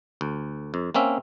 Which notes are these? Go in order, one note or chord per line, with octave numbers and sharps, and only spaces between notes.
D2
F2
A#3 C4 C#4 E5